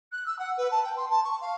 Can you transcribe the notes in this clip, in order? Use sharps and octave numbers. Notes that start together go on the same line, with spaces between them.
F#6
E6
F#5
B4
A5
G5
C6
A5
C#6
F5